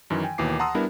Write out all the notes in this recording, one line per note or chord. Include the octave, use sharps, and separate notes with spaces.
F#2 D#3 E3
G5 G#5
D#2 B2 E3 D6 C7
F#5 A5 A#5 C6 D#6 E6
G3 B3 D4 E4 A#4